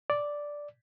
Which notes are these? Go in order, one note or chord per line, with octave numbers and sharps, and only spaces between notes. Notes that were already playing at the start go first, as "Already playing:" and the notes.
D5